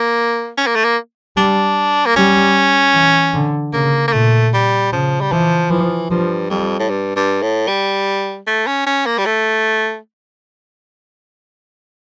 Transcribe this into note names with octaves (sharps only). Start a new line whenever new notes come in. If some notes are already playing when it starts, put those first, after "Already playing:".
Already playing: A#3
C#4
A#3
A3
A#3
G3 D4
A#3
G3 C#4
E3
D3
C#3 A#3
A#3
A#2 A3
G3
C#3 F3
G3
E3 F3
E3 F3
G2 F3
F2 G3
A2
G2
G2
A2
G3
A3
C#4
C#4
A#3
G3
A3